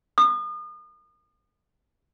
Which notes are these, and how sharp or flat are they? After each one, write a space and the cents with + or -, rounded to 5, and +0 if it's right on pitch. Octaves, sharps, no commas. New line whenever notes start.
D#6 -35